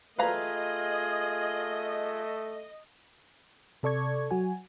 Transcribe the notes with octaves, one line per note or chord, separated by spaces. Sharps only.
A3 F4 G#4 B4 D#5 F5 A#5
C3 A4 D5 C#6 G#6
F#3 F#4 G#5